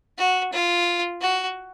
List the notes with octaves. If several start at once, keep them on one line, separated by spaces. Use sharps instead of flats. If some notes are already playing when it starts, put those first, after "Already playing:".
F#4
F4
F#4